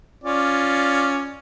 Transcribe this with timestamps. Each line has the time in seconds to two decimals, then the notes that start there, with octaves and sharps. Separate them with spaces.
0.24 C#4 F4 D5